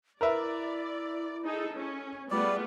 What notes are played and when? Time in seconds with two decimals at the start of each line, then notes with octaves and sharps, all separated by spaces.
0.21 E4 A#4 B4 D5 E5
1.45 D#4 G#4 A4
1.76 C#4
2.31 G3 A3 B3 F4 G#4 D5